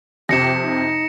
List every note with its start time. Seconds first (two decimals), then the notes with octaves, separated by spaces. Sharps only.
0.29 F2 C3 G4 A#6 C#7 E7
0.63 D#4